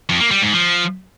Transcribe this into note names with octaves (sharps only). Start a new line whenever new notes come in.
F2
A#3
G3
G#2
F3